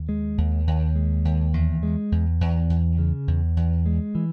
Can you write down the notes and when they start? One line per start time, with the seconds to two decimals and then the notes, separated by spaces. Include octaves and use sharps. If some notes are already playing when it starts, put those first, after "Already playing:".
Already playing: D#2
0.09 G#3
0.38 D#2
0.67 D#2
0.96 G#3
1.25 D#2
1.54 E2
1.83 G#3
2.12 E2
2.41 E2
2.70 E2
2.98 C#3
3.27 E2
3.57 E2
3.86 G#3
4.15 E3